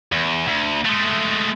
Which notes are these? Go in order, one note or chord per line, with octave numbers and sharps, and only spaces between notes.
E2
D2
G#3 A3